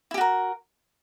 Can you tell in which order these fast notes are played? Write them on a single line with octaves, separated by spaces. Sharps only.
E4 G4 F#4 A#4